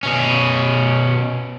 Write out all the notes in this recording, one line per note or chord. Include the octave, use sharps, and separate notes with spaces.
B2 C#4